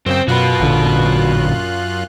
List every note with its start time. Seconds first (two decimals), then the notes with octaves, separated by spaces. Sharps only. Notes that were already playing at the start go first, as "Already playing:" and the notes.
0.06 F#2 C#3 C4 G5
0.28 F#2 B2 F4 F#4 B4 F#6
0.60 A1 A#2 D3